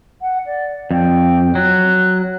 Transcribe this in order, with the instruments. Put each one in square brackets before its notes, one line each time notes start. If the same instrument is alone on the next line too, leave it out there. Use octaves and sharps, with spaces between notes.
[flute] F#5
D5
[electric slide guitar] F2 [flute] G5
[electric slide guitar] F#3 [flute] F#6